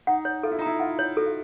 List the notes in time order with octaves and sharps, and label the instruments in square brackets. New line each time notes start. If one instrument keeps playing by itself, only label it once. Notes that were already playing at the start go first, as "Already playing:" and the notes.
[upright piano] D#4 [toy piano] F#5
[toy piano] C#5
[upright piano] F4 [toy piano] A4
[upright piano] E4
D#4
[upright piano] E4 [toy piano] A#5
[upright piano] F4 [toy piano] F#5
[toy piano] C#5
[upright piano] F#4 [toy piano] A4
[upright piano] F4